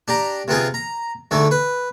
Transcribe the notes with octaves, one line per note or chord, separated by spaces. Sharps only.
D4 G4 A#5
C3 B3 F4 G#4
A#5
D2 G#2 A3 A4
B4